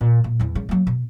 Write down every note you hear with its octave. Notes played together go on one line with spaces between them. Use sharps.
A#2
A#2
E2 E3
C#3 G3
F#3 A#3
B2